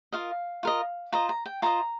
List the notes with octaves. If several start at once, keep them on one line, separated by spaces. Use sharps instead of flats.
F4 A#4 D#5 F5
F4 A#4 D#5
F4 C5 D#5 A#5
A#5
G5
F4 C5 D#5 A#5